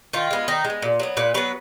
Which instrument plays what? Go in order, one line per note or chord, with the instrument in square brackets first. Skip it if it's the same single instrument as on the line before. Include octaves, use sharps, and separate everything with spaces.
[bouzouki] D#3 F4
G#3 B3
D#3 D#4
G#3
B3
A#2
F#3 B3
A#2 B4
F#3 B3 B4